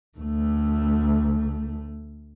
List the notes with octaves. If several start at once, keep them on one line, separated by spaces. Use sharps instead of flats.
D2 A3